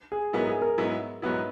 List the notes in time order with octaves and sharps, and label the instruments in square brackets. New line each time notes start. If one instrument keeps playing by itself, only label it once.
[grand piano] G#4
[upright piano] G#2 F#3 B3 E4 [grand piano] A#4
[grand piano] G#4
A#4
[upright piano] G#2 F#3 B3 E4
[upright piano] G#2 F#3 B3 E4 [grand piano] B4